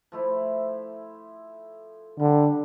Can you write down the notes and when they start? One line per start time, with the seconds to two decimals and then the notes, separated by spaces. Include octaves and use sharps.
0.12 F3 A3 E4
2.20 D3 G3